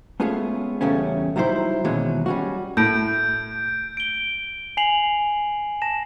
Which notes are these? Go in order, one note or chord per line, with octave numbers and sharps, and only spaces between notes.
G#3 A3 B3 C#4 F4 G#4
E2 C#3 G3 A3 C#4
F#3 G3 D#4 E4 C5
D#2 B2 E3 F#3 G#3 C#4
G3 C#4 F#4
A2 G6 D7
D7 G7
G#5 C7 F7 F#7
A5 A#6 E7